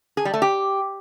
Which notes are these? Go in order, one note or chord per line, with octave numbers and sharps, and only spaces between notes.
G#4
G3
A3
G4